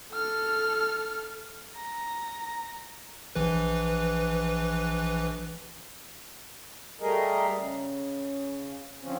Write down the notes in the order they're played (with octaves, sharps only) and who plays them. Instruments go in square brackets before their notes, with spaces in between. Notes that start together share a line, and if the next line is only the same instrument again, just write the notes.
[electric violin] A4 F6
A#5
[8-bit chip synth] A#1 E3 B4
[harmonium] G3 A3 G#4 A#4 D#5
C#3
D3 F3 C4 C#4